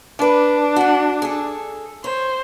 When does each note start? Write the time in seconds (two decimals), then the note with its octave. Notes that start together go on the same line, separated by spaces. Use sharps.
0.19 D4 B4 D5
0.76 F#4 F#5
1.22 G#4 A4
2.04 C5 C#5